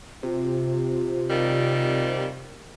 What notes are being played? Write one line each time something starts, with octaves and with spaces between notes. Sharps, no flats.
C3 F4
A#2 D#3 G3